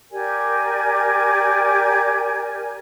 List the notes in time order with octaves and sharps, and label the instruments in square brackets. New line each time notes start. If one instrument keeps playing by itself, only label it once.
[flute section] G4 A#4 D5 G#5